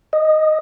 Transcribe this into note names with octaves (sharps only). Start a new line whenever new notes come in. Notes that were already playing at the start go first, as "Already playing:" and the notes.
D#5